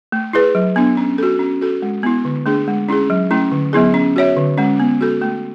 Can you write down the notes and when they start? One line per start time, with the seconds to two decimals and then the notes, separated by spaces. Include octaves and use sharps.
0.12 A3
0.33 E4 G#4 B4
0.55 F#3
0.76 B3 D4
0.97 C#4
1.18 F#4 A4
1.39 C#4
1.61 F#4 A4
1.82 G#3
2.03 B3 E4
2.25 D3
2.46 A3 D4 G#4
2.67 G#3
2.89 C#4 E4 G#4
3.10 F#3
3.31 A3 C#4 E4
3.52 D3
3.73 F#3 B3 E4 G#4
3.94 C#4
4.16 F#4 C#5 E5
4.37 D3
4.58 G#3 C#4
4.80 B3
5.01 F#4 A4
5.21 A3